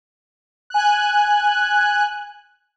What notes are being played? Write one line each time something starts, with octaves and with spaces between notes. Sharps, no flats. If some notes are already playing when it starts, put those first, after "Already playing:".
G#5 F#6